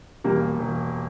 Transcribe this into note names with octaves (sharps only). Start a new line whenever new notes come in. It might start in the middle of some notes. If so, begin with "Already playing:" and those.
E1 G3 A#3
E1